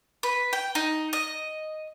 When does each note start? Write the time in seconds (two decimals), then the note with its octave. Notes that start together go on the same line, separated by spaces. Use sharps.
0.23 B4
0.53 G5
0.75 D#4
1.13 D#5